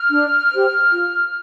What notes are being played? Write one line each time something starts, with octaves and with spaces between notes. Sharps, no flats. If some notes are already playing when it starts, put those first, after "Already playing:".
Already playing: F6
D4
G4 C5
F4